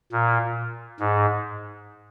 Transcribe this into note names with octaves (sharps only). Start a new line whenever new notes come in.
A#2
G#2